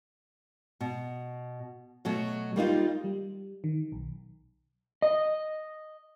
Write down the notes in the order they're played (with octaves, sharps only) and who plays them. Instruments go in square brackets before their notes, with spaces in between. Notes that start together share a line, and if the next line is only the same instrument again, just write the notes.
[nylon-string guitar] B2
B2 F#3 A3
G3 A#3 D#4 F4
[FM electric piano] G3
D#3
B1
[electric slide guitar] D#5